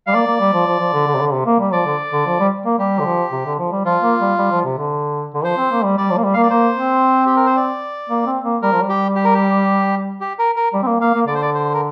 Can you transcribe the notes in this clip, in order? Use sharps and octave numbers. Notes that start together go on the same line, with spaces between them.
G3 F5
A#3 D5
A#3
G3
F3
F3
F3
D3
D3
C3
D3
C3
A#3
G3
F3 D5
D3
D3
F3
G3
A#3
G3 G4
D3
F3
C3
D3
F3
G3
F3 F4
A#3
G3
G3
F3
C3
D3
D3
F3 C5
C4
A#3
G3
G3 D5
F3
A#3
G3
A#3 F5
D5
A#3 C5
C4
G4
A#4
C5
D5
A#3
C4
A#3
G3 A#4
F3
G3
G4
G4
A#4
G4
G4
A#4
A#4
G3
C4
A#3
A#3 F5
A#3
D3 D5
C5
D5
C5
A#4